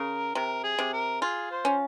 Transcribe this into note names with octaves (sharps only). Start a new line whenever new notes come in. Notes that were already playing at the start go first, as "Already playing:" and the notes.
Already playing: C#3 A#4
C3 A#4
G#4
C3
A#4
F4 G#4
C5
C#4